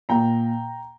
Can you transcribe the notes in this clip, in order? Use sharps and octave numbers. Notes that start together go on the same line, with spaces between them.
A#2 G5 A#5